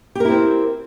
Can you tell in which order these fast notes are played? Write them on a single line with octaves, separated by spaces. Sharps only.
G4 A#4 E4 C4